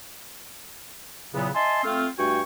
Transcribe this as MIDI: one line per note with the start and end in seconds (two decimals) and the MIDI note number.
1.34 1.49 40
1.34 1.49 46
1.34 1.49 49
1.34 1.49 54
1.34 1.49 59
1.55 1.82 75
1.55 1.82 76
1.55 1.82 80
1.55 1.82 81
1.55 1.82 84
1.83 2.07 57
1.83 2.07 60
1.83 2.07 65
2.18 2.41 43
2.18 2.41 57
2.18 2.41 66
2.18 2.41 79
2.18 2.41 80
2.18 2.41 85